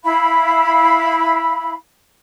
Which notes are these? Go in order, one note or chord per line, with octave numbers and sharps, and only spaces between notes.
E4 F5 B5